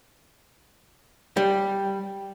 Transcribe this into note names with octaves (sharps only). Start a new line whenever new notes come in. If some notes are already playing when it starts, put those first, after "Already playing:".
G3